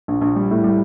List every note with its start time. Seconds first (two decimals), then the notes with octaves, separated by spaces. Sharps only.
0.08 A#1
0.21 A#1
0.35 G3
0.51 A2
0.64 G3